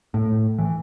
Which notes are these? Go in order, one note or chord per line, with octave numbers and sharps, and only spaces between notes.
A2
E3